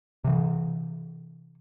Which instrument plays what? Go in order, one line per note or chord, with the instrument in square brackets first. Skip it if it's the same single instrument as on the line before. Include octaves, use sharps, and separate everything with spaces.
[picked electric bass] C3 E3